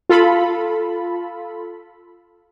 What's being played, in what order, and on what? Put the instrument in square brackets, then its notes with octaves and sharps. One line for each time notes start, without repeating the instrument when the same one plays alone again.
[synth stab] F4 A4 B5